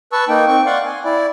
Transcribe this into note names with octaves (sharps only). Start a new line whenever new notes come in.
B4 A5 C#6 E6
A#3 D#4 G5
C4 G5 C#6
D5 F5 F#5 C6 C#6
G#5
E4 D5